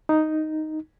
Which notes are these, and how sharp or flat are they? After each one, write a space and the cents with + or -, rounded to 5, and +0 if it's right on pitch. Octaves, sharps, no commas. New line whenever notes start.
D#4 +0